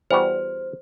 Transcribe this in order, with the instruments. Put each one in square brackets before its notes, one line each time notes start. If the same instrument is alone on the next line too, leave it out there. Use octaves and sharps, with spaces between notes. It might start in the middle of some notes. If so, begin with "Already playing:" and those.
[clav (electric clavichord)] E2 G3 F#4 [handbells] C5